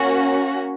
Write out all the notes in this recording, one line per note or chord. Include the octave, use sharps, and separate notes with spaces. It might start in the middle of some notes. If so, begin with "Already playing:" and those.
Already playing: A#3 C#4 F#4